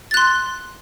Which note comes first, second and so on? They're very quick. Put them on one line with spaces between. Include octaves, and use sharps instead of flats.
A6 F#6 C6